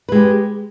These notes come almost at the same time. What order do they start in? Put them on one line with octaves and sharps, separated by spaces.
B4 G#3 G4